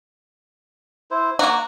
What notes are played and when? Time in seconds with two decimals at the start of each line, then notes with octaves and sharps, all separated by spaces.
1.11 E4 C5
1.39 A#3 F#4 A#5